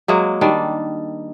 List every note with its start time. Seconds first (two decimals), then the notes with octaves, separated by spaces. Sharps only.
0.08 F#3 G#3 A#3
0.41 D#3 G3 D4